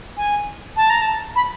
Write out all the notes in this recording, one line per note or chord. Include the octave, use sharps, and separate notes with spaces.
G#5
A5
A#5
A5
B5